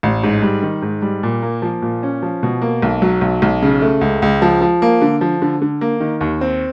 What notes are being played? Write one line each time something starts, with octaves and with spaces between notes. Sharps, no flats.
A1
G#2
G3
D#3
G#2
G3
A#2
A#3
F3
A#2
C#4
F3
B2
A#3
B1
F#3
B1
B1
C#3
A3
C#2
C#2
F3
F3
A#3
D3
F3
D3
D3
A#3
D#3
D#2
C4